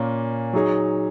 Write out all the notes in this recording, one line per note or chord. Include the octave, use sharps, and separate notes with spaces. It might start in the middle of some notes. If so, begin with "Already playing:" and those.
Already playing: A#2 A#3 C#4
F#3 D#4 G#4 C#5